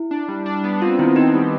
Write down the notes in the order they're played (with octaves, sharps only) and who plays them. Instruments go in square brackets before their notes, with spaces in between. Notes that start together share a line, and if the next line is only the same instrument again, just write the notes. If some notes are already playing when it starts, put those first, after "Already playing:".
Already playing: [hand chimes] E4
[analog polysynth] D4
G3
D4
B3
[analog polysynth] C4 [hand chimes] F4
[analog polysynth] D#3 [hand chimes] E4
[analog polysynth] C4 [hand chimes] D#4
[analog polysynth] G3